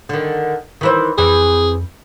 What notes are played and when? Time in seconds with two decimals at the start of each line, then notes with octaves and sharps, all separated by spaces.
0.09 D3 D#3
0.81 D#3 E3 C5
1.18 F2 E3 C4 G#4